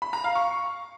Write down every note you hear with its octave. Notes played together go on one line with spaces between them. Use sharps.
B5
A#5
F5
C#6